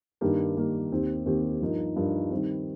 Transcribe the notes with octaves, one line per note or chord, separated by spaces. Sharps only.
G2 D#3 A#3 G4 A#4
G2 D#3 A#3 G4 A#4
D#2 D#3 C4 G4
D#2 D#3 C4 G4
G2 F3 D#4 A#4
G2 F3 D#4 A#4
D#3 G3 C4